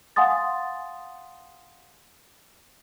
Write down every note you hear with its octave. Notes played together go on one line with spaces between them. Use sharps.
F5 F#5 G#5 C6 D#6 A6